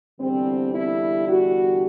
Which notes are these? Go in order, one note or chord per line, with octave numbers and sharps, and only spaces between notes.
E2 D3 G3 C4
E4
F#4